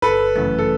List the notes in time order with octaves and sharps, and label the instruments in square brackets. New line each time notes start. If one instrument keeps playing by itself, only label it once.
[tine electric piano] G1 [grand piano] A4 B4
[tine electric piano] F#2 C#3 E3 A3
[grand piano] A4